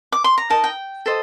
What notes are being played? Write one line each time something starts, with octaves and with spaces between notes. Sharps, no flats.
D6
C6
A#5
D#4 A#4 D#5 A5
G5
A4 C5 D#5